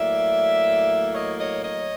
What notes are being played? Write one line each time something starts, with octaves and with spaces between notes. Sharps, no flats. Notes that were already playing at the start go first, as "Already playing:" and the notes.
Already playing: A2 F#3 A#3 D5 E5
C#5 D#5
C#5 D#5
C#5 D#5